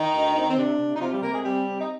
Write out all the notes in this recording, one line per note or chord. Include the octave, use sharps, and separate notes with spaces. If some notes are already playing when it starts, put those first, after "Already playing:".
Already playing: D#3 D#4
D2
C4
C4
C3 D4
C3
D#4
C3 F3 F4
G3 G4
C3 A#3 A#4
G#3 G#4
G3 C4 G4
C4
D#4